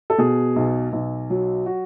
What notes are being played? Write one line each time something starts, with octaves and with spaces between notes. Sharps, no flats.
A4
B2 G#4
B1
B1
F#3
F#4